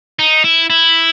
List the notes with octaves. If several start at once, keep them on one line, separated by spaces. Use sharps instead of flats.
D#4
E4
E4